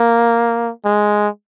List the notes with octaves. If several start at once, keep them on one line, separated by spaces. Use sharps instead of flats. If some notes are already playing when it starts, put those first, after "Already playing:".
Already playing: A#3
G#3